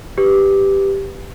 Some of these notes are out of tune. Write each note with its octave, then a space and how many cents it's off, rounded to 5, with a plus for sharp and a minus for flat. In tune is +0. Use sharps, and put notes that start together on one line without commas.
G4 +0 B4 +0